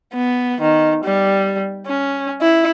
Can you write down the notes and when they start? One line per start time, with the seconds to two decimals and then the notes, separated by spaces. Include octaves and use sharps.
0.14 B3
0.61 D#3
1.04 G3
1.86 C#4
2.41 E4